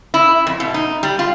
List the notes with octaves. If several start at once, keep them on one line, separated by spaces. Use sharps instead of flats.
E4
F2
B2
D#4
G3
F4